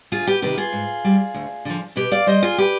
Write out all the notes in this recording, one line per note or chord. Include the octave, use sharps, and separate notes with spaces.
D2 F4 G#4
G4 B4
C3 D#3 G4 B4
F4 G#4
G#2
G3
D2
D3 F3
B2 G4 B4
D5 F5
G3 C5 D#5
F4 G#4
G4 B4